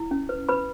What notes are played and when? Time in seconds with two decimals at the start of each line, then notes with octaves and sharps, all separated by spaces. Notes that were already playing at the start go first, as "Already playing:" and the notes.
Already playing: E4
0.11 C#4
0.29 B4
0.49 B4 B5